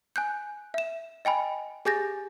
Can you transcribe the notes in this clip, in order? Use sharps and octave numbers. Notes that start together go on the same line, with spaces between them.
G#5 F#6 G6
E5 E7
D#5 G5 G#5 B5
G4 G#4 G#5 G6 A6 A#6